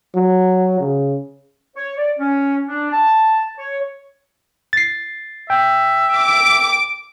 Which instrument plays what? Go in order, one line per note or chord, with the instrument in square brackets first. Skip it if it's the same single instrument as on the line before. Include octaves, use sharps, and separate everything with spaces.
[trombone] F#3
C#3
[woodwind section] C#5
D5
C#4
D4
A5
C#5
[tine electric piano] A6 C7
[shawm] E5 [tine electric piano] G5
[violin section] D6